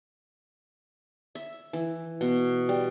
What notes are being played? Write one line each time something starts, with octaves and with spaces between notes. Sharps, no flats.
E5
E3
B2
G3